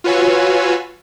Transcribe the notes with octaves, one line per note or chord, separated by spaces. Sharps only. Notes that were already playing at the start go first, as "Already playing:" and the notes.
F4 F#4 B4 C#5 G#5 E6